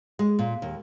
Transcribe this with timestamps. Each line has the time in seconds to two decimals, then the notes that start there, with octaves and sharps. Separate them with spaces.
0.19 G#3
0.39 A#2
0.62 D#2